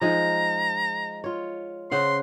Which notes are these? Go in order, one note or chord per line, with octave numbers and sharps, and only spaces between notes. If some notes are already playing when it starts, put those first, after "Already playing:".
F3 G#3 D#4 A#5
F4 C#5
C#3 C5 F#5 C6